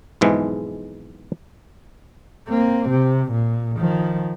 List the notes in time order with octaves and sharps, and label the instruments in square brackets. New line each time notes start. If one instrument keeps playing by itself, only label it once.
[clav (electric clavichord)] B1 F2 G#2 E3 G#3
[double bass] A#3 C4
C3
A#2
D#3 F3